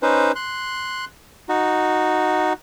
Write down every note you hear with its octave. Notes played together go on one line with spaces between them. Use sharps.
C#4 D#4 B4 C5
C6 F#6
D#4 F#4